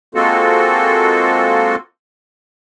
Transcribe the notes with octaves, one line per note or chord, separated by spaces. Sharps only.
G#3 A#3 C4 F4 F#4 A4